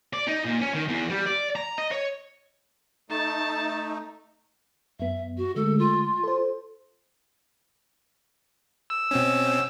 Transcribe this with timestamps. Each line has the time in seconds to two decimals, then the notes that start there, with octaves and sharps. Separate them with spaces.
0.13 D5
0.27 D#4
0.45 A#2
0.61 C#4
0.74 D#3
0.88 E2
1.10 G3
1.26 D5
1.56 A#5
1.78 D#5
1.91 C#5
3.10 A3 D#4 A5
5.00 F#2 B3 E5
5.37 F#4
5.56 D3 G#3 A3 A4
5.79 F4
6.24 A4 C5
8.90 E6
9.11 B2 C4 C#4